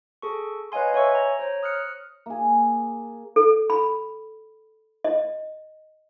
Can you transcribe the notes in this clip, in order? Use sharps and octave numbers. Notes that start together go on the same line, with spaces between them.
G#4 A4 C#6
B4 C#5 D#5 F5 G#5 C6
C#5 E5 G#5 C#6 E6
A#5
C5 C#5 A#5
D#6 F6 F#6 C#7
A#3 G#4
A4
B5
D#5